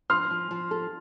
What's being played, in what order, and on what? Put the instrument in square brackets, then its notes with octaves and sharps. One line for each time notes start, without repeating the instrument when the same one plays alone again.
[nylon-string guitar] F3 [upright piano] C6 F6
[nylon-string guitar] F3
F3
A4